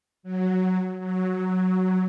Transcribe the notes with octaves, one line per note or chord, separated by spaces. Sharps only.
F#3
F#3